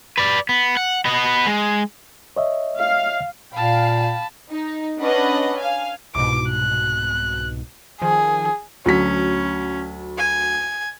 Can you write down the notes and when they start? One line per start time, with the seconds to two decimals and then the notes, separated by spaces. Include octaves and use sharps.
0.18 B4 D5
0.49 B3
0.77 F#5
1.06 B3 D#5
1.47 G#3
2.36 C#5 D#5 E5
2.78 F5
3.54 A#2 F5 G5 A5 B5
4.51 D#4
5.00 C#4 D4 B4 D#5 F#5
5.60 F5 G#5
6.15 C2 G#2 B2 D6
6.50 F#6
8.02 D#3 F3 G#4
8.86 D2 F#3 C#4 B6
10.17 G#5